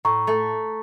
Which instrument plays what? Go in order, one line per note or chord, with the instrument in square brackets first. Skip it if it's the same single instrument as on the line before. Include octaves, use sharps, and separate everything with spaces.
[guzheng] A2 [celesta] A#5 C#6
[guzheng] A3